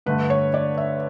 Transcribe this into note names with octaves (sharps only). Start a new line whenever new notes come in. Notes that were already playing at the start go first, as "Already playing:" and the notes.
G2 D3 A3 B4
C#5
D5
E5